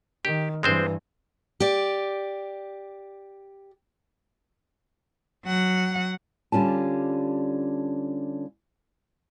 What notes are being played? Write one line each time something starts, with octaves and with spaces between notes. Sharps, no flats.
D#3 G4
G2 E3 G#3 C4 C5
G4 D5
F#3 F#5
D3 G3 C#4 F4 A5